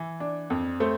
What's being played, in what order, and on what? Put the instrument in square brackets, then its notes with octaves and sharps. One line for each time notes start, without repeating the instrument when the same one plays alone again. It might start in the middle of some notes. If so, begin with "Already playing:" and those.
Already playing: [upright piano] E3
D4
F2
A3 C5